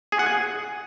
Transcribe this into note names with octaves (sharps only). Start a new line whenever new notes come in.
G#4
F#5
G#5